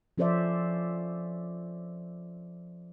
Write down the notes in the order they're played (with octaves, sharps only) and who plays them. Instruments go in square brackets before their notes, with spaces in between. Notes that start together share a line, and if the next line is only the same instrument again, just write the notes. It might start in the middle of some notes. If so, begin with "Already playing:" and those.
[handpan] F3 C#4 A4 C5 D5 E5